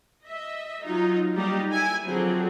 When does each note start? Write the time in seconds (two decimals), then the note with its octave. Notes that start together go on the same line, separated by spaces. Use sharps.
0.24 D#5 E5
0.82 F#3 D#4 F4
1.33 G3 A#3 D#4 G4
1.70 E4 G#5
2.04 D3 F3 F#3 C4 G#4